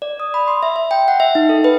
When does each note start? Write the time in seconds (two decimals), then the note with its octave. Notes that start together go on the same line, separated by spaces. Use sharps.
0.02 D5
0.20 D#6
0.34 B5
0.48 C6
0.63 E5
0.76 E5
0.91 G5
1.08 F#5
1.20 E5
1.35 D#4
1.49 A4
1.64 B4